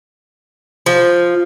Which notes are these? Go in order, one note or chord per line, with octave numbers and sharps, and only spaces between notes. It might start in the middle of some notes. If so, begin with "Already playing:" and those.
F3